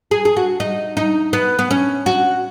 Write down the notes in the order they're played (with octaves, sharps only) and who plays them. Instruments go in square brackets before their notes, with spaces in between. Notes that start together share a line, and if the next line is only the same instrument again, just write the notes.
[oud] G#4
G#4
F#4
D#4
D#4
B3
B3
C#4
F#4